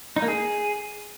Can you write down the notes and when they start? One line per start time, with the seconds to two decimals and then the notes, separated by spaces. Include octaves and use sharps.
0.16 D#4
0.22 A#3
0.28 G#4